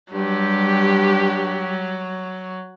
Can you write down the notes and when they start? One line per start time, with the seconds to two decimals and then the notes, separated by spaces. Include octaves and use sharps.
0.13 G2 F#3 G3 G4